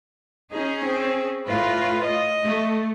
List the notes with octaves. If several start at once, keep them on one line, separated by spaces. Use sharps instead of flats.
C#4 D#4 G#4
C4
A2 F4 B4
D#5
A3